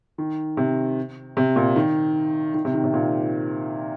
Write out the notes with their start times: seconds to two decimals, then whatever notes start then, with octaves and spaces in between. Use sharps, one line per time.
0.18 D#3
0.57 C3
1.37 C3
1.56 A#2
1.76 D#3
2.54 D#3
2.65 C3
2.74 D#3
2.84 C3
2.94 A#2